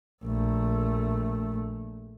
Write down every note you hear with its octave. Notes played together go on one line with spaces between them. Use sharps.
A#1 A3